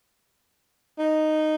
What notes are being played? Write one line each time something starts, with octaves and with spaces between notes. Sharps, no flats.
D#4